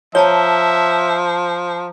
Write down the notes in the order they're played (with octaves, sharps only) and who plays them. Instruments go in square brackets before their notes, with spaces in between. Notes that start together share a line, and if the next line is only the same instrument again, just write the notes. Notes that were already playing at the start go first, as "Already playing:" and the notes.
[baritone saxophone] F3 [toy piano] C#5 [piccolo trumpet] E5 [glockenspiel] A5 A#5 G7